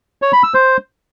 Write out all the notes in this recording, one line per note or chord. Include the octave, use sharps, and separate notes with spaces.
C#5
B5
E6
C5